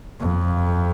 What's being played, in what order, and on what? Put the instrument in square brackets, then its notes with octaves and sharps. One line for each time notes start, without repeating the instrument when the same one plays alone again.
[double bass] F2